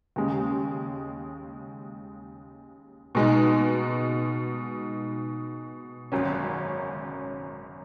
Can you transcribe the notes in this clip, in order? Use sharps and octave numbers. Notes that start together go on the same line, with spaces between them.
D#2 C#3 G#3
B2 G#3 D#4
G#1 F#2 F#3 C#4